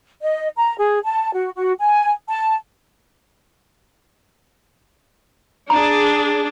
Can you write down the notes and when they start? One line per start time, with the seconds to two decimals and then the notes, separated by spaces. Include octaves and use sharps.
0.21 D#5
0.56 A#5
0.79 G#4
1.04 A5
1.33 F#4
1.55 F#4
1.80 G#5
2.29 A5
5.70 D4 G#4 A#5